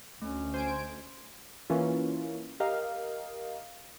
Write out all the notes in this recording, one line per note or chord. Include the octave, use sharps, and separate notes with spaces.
D2 A3 C#4
C5 G#5 D7
E3 A#3 C#4 F4
G4 A#4 D#5 F5